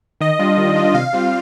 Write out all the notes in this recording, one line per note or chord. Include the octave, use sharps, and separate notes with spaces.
D#3 D#5
G3 D4 F4
D#3
G3 D4 F4
C3 F5
G3 C4 F4